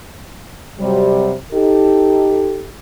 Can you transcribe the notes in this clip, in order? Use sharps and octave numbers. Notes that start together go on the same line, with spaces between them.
C3 F#3 G3
D#4 G4 A4